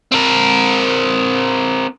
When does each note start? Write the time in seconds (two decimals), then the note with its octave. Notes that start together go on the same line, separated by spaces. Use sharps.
0.12 C4 A#4